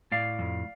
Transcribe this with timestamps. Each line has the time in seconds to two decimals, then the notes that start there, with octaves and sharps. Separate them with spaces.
0.12 A2 D5 F5
0.39 F2